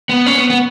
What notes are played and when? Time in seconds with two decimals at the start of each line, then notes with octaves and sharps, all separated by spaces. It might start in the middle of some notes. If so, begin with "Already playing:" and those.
0.09 B3
0.26 C#4
0.38 B3
0.50 B3